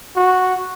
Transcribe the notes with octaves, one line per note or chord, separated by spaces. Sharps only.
F#4